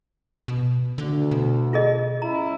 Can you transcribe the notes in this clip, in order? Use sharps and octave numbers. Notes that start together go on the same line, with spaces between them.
B2
D2 D3
B2
F4 G#4 D#5
C#2 C#4 E4 A#5